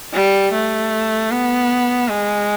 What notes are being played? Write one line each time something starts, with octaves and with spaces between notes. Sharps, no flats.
G3
A3
B3
G#3